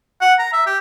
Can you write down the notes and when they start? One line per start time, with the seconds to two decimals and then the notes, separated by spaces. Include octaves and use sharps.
0.21 F#5
0.39 A#5
0.53 E5
0.66 G4